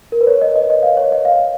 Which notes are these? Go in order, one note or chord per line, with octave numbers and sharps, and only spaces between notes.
A#4
B4
C#5
D#5
D#5
D#5
F5
C#5
D#5
F5